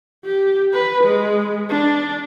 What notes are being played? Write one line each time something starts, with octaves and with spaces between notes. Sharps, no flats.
G4
B4
G#3
D4